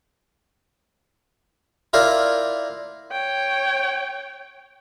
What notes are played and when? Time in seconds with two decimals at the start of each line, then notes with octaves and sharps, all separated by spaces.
1.93 E4 F4 A#4 C5 D5
3.12 C#5 G5